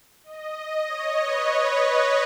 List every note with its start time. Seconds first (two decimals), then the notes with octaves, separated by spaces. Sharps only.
0.23 D#5
0.55 D#5
0.86 C#5
1.18 B4